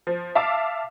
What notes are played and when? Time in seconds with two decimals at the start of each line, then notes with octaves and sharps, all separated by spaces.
0.07 F3
0.35 E5 F5 A5 D6